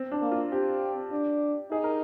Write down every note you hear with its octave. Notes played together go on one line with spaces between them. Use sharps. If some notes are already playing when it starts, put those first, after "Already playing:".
Already playing: C4
D4
A#3
F4
C4 G4
D4
D#4 G#4
A#4